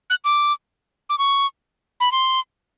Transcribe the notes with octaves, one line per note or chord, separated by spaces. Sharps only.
F#6
D6
D6
C#6
B5
C6